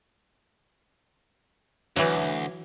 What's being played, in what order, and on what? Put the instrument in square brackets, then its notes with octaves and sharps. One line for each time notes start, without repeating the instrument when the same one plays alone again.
[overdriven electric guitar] D2 [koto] E3 F#3